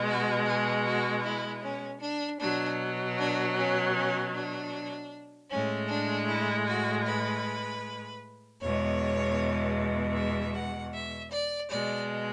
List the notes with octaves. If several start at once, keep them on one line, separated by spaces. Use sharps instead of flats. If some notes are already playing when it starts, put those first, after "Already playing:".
Already playing: B2 G#3
F#4
G#4
F#4
E4
C#4
D4
B2 F#3 D4
D4
C#4
C#4
D4
A2 G#3 C#4
D4
E4
F#4
B4
E2 B2 G#3 C#5
E5
F#5
E5
D5
B2 G#3 D5